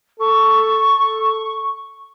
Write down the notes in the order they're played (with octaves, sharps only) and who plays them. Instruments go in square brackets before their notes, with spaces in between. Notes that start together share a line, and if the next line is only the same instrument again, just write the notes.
[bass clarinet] A4 [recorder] C#6